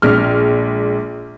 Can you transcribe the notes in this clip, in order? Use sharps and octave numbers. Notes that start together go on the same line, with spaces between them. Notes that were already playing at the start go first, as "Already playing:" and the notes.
A#1 G#3 F6